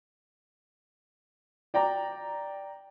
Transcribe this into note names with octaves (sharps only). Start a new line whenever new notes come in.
D5 G5 A#5